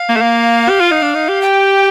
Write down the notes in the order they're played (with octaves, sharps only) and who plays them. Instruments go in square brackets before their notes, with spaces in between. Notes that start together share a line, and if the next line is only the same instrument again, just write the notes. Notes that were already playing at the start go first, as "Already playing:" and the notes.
Already playing: [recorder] F5
[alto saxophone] A#3
A3
A#3
G4
F4
D#4
D4
D#4
G4
[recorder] G5